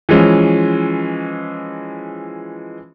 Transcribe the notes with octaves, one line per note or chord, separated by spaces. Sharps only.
E3 F3 G#3 C#4